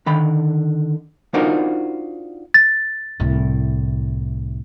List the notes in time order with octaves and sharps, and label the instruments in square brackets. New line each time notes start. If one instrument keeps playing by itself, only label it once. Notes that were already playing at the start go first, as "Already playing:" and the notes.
[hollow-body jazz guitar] D3 D#3 B5
D4 D#4 F4 F#4 A#4 C5
[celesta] A6
[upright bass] C2 A2